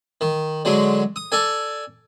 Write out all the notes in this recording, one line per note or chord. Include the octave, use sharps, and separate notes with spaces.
D#3
D3 F#3 G#3
D#6
A4 D5 G#5